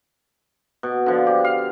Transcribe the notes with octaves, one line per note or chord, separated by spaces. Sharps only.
B2
D3 F3
G4
F5